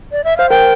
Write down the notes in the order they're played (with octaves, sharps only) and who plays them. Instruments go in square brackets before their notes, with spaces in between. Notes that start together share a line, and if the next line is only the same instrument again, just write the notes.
[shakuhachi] D5
E5
[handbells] C5 [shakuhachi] F5
[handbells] A#4 [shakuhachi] G5